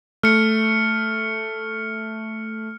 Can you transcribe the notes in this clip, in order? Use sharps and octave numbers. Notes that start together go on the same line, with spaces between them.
A3 F6 C#7